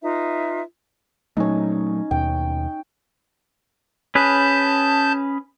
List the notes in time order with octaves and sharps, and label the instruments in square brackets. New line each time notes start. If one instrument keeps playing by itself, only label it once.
[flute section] D#4 F4 B4 E5
[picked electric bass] A#2 F#3 A3 [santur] C#4 D#4
[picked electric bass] D#2 B2 [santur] G5
[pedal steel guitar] C#4 G#4 B4 [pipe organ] A5 G6